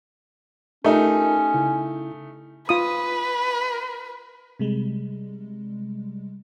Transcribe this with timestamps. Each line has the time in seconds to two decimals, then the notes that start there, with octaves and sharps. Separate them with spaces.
0.84 A3 C#4 D#4 F4 G4 A#4
1.54 C#3 E4
2.69 F4 B4 D#6
4.59 C3 G3 G#3